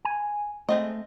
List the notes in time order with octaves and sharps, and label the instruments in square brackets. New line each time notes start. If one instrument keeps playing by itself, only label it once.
[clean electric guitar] G#5
[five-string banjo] G#3 C4 D#5 [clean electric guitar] A3